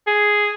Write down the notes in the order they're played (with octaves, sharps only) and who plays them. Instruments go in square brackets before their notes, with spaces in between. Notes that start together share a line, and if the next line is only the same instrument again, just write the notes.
[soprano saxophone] G#4